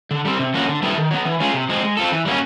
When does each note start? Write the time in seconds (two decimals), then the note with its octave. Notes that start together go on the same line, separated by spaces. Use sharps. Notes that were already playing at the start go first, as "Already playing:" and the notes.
0.11 D3
0.25 G3 C4
0.39 C3
0.54 F3 A#3 C#4 F#4
0.68 D3
0.82 G3 B3 E4 A4
0.98 D#3
1.11 F#3 B3
1.25 E3
1.40 G#3 C#4 F4 G#4
1.54 C3
1.69 F3 G#3 C4
1.83 G#3
1.97 C4 F4 A4
2.12 E3
2.25 G3 A#3 C#4 F#4